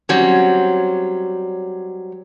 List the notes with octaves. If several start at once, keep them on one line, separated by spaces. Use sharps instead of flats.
F#3 G3 C4 C#4